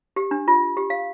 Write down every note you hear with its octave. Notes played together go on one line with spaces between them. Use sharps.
G4
D4
F4
G4
F5